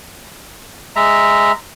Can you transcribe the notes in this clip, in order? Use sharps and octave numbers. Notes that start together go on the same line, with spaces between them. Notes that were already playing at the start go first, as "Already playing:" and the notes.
G#3 E5 A#5